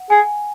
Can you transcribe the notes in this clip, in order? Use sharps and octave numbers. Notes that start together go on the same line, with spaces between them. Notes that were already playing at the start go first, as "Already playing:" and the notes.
Already playing: F#5
G#4 G#5